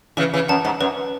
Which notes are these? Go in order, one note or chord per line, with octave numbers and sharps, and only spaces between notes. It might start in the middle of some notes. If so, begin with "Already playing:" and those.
C#3 E3 B4
C#3 E3
F#2 F#5 A5
G#2
F#2 B4